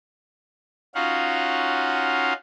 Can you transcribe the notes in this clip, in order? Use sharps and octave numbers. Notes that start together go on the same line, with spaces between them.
C#4 D#4 F4 F#4 F5 F#5